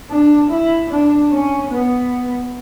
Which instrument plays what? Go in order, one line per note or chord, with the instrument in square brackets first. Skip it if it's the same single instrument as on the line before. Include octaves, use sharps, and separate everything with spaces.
[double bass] D4
E4
D4
C#4
B3